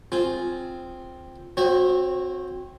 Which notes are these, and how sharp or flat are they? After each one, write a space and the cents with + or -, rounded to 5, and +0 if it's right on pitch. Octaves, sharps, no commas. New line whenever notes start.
C4 +0 F4 +0 G#4 +0
C4 +5 F#4 -20 C#5 -25